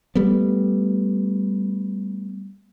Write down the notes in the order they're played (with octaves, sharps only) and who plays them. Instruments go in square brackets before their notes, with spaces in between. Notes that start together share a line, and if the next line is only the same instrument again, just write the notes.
[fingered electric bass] G3 A3 B3